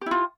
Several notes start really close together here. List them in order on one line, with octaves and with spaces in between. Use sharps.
G4 E4 F4